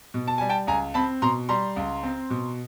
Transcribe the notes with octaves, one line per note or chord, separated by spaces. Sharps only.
B2
A5
G3 G#5
G5 A5
C#2 G#5 A#5
C4 A5 B5
B2 A#5 C6
G3 A#5 C6
C#2
C4
B2